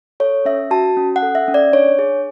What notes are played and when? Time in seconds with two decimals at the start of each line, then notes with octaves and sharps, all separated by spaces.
0.20 A4 C#5
0.45 C#4 E5
0.71 F#4 A5
0.97 C#4
1.16 F#5
1.22 A4
1.35 E5
1.48 C#4
1.54 D5
1.72 D4 C#5
1.99 G#4